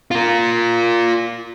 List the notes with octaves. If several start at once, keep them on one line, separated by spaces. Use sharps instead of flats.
F4 A#4